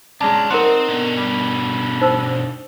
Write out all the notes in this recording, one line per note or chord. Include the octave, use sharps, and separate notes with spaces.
G#3 C#4 D4 A5 A#5
C4 D#4 A#4 F#5 C6
B2 D3
G3
D#4 C5 E6